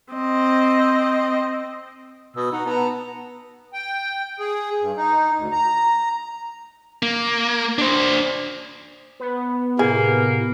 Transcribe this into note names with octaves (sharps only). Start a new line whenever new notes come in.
C4 D#5
B2 D#6 E6
D#4 F#5
B3 F#5 A5 A#5
G5
G#4
G2
D#4
D2
A#5
A#3
D4 C5
B3
A2 C3 A#3 G#4